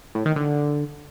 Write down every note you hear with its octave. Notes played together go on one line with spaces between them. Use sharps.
A2
D#3
D3